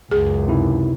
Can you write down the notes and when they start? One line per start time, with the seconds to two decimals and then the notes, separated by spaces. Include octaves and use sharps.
0.11 C#2 F#2 G#4
0.48 C3 D#4 E4